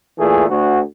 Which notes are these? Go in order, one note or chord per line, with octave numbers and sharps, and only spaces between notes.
A#2 E3 A3 G#4
D2 F#4